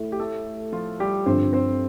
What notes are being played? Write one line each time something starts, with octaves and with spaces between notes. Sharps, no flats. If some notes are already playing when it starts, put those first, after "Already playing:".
Already playing: A2
G4
A3 A4
F3 F4
G3 G4
G2 D3 F3 C4 C5
C4 C5